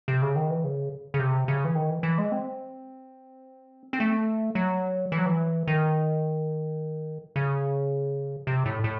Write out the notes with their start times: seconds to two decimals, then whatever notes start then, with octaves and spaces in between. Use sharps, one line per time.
0.08 C3
0.22 C#3
0.36 D#3
0.50 E3
0.64 C#3
1.14 C#3
1.19 C3
1.48 C#3
1.65 E3
1.75 D#3
1.90 E3
2.03 E3
2.18 G#3
2.32 C4
3.93 C4
4.00 A3
4.55 F#3
5.12 E3
5.18 F#3
5.26 E3
5.67 D#3
7.36 C#3
8.47 C3
8.65 A2
8.84 A2